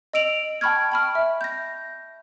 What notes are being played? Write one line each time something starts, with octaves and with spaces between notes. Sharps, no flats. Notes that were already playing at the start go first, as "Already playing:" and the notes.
D#5 E6 D7 F7 F#7
G5 A5 B5 C#6 F6 G#6
G5 A5 B5 C#6 F6
E5
G6 A#6